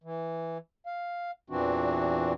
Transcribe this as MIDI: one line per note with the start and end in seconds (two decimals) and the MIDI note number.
0.04 0.58 52
0.86 1.31 77
1.50 2.33 40
1.50 2.33 46
1.50 2.33 52
1.50 2.33 60
1.50 2.33 62
1.50 2.33 66